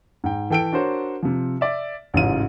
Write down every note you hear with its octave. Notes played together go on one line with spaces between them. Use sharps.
G#2 G5
E3 A4 G5 E6 D7
D4 F#4 A#4 C5 C#5
C3 F3
D5 E5
A1 G#2 C#3 E3 F4 D#7